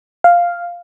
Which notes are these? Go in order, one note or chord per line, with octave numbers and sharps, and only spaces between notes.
F5